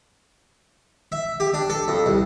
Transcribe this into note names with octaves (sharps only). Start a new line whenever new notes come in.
E5
G4
D4
A4
F2
C2